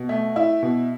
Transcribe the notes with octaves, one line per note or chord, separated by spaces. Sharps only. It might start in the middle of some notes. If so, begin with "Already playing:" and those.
Already playing: B2
A3
E4
B2